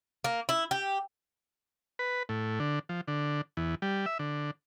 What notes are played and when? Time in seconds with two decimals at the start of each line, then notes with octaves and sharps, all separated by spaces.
0.24 A#3
0.49 E4
0.71 G4
1.99 B4
2.29 A2
2.60 D3
2.89 F3
3.08 D3
3.57 E2
3.82 G3
4.06 E5
4.19 D3